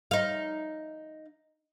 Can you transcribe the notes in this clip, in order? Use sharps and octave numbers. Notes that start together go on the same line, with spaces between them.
D#4 F5